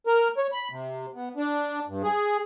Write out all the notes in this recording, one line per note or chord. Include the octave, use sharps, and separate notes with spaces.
A#4
C#5
B5
C3
B3
D4
G2
G#4